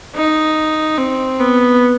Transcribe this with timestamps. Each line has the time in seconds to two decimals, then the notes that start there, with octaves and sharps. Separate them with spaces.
0.15 D#4
0.98 C4
1.40 B3